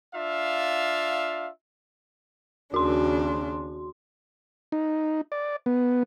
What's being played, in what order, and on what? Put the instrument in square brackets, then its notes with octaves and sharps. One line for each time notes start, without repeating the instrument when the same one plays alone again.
[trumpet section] D4 F4 E5 F5
[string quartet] D#2 C#3 D4 [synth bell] F#4 C6
[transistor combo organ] D#4
D5
B3